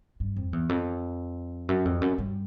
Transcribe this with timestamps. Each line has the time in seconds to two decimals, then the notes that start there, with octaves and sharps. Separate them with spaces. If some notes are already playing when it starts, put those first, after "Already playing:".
0.20 G2
0.36 F2
0.53 E2
0.69 F2
1.69 F#2
1.85 F2
2.01 F#2
2.18 G2